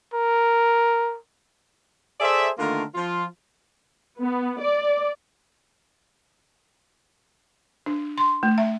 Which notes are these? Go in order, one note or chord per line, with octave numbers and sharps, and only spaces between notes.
A#4
G#4 A4 C5 D5 E5
D3 D#3 A3 A#3 F4 A#4
F3 F4
B3
D5
D4
C6
A3
E5